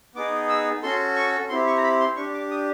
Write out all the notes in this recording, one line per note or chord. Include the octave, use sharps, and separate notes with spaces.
B3 D#4 G#4 D6
E6
C#4 F#4 A4 C6
C#6
C4 E4 G4 C6
C#6
A#5
B5
C6
D4 G4 C#6
D6
D#6